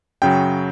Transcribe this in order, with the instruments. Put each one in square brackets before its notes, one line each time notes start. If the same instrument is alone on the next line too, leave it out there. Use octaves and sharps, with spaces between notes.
[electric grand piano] F#2 C#3 F#3 G5